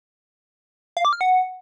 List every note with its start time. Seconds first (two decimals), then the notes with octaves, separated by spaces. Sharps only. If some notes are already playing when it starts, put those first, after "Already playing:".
0.97 F5
1.05 D6
1.13 F6
1.21 F#5